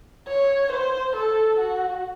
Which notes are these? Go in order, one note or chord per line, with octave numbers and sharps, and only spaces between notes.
C#5
C5
A4
F#4